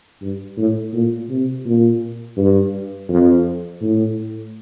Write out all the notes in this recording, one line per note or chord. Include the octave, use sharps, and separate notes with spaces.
G2
A2
A#2
C3
A#2
G2
F2
A2